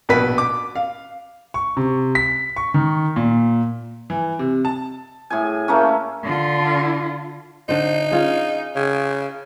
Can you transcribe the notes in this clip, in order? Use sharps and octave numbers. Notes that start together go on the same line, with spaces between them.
A#1 B2 B4 B6
D6
F5
C#6
C3
B6
C#6
D#3
A#2
E3
C3
A5
A2 G#4 G#5
A3 A#3 C#4
D3 F4
D3 D#4 C5
C#4 F4 G#4
C#3